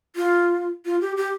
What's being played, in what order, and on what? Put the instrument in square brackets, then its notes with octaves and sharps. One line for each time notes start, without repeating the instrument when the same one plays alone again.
[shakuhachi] F4
F4
G4
G4